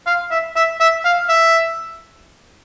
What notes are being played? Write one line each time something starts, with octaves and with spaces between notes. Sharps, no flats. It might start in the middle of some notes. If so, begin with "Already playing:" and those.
F5
E5
E5
E5
F5
E5